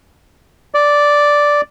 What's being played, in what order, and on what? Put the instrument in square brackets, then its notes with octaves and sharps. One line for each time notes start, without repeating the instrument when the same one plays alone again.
[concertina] D5